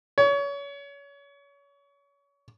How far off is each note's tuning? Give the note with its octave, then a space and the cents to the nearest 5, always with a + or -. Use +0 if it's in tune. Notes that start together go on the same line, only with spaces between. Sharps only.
C#5 +30